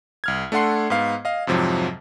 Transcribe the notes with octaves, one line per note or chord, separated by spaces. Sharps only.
C2 F6 G#6
A3 D4 A4 F#5 C6 C7
G#2 B3 F5
D#5 F5
F2 G#2 C3 F3 F#3